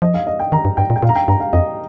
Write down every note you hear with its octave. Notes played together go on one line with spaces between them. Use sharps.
F3 D#5
F5
D#5
G5
D#3 A#5
G2
G2 G5
A#2
G5
A#2 F5
A#5
G5
G2 A#5
F5
F2 D#5